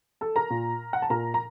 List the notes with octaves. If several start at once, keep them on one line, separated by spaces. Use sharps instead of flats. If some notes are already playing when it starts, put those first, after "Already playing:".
A4 A5
A#4 A#5
A#2
F#5
A5
A#2 A#4 A#5
A#5